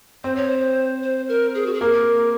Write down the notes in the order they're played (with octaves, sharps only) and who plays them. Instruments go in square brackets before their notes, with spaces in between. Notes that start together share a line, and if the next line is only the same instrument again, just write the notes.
[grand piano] C4 [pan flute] C5
[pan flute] C#5
C5
C5
A#4
G#4
F#4
G#4
[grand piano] A#3 [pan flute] A#4